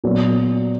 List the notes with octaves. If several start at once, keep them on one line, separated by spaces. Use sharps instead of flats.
A#2 F#3 B3